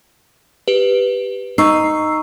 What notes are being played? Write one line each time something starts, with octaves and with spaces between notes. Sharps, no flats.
G4 B4
D#4 C#6 E6 C7